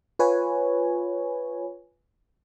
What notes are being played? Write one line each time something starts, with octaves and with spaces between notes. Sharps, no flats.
F4 B4 C#5 G#5